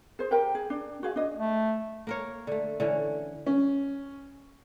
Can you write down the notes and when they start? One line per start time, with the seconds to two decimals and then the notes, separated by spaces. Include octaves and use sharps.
0.19 G#4 C5
0.31 G4 A#4 G5
0.55 G#4
0.70 D4
1.03 F#4 G#4 F5
1.16 D4 D#5
1.36 A3
2.07 A#3 A#4 C#5
2.47 D3 A3
2.80 D3 E3 C#4
3.46 C#4